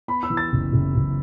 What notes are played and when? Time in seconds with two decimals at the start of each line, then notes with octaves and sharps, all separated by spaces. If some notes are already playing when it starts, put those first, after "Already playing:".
0.08 B3 B5
0.23 E6
0.30 E3
0.37 A6
0.52 F#1
0.73 F#1
0.95 F#1